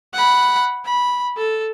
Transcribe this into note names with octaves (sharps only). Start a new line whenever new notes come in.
F#5 B5
B5
A4